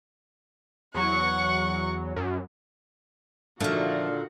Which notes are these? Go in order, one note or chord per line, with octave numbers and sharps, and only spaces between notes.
E2 F#3 F#5 C#6
F#2
A#2 D3 D#3 F3 A3 D4 F#4 F5